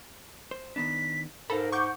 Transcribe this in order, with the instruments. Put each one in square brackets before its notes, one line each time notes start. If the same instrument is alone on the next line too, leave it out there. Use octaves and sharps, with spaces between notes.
[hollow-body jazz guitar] C5
[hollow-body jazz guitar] D#3 B3 D4 [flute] B6
[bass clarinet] G#2 [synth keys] A4 [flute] A#4 [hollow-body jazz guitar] F5 A#5 B5
[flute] F#5 [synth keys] C#6 D6 G6